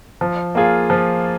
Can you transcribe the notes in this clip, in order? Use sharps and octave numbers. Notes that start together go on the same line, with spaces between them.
F3
A#3 F4 G#4
F3